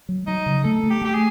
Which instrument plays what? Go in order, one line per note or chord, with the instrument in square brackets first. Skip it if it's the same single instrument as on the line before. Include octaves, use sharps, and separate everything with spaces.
[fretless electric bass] F#3
[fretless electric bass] F#3 [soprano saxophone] D#4
[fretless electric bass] C#3
[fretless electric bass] A3 [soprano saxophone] A4
[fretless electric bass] A3
[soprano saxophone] G4
[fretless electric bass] A3 [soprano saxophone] G4
[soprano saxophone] G#4